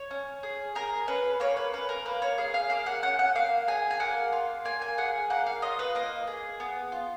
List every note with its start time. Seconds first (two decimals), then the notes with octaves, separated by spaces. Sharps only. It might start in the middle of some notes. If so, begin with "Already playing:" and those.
Already playing: C#5
0.11 C#4
0.43 G#4
0.75 G#4 A#4
1.08 C#4 B4
1.40 A#3 C#5
1.57 B4
1.73 C#4 B4
1.89 A#4
2.06 A#3 B4
2.22 C#5
2.38 G#4 F5
2.54 F5
2.70 A#3 F5
2.86 F#5
3.03 C#4 F#5
3.19 F#5
3.35 A#3 F5
3.68 G#4 G#5
3.91 G#5
4.00 A#3 F#5
4.33 F4
4.65 A#3 G#5
4.82 G#5
4.98 G#4 F#5
5.30 A#3 F#5
5.46 F5
5.62 F4 D#5
5.79 B4
5.95 A#3 D#5
6.27 G#4
6.60 B3
6.92 F4